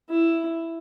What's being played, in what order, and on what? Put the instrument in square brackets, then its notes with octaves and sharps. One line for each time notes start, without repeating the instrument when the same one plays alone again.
[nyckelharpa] E4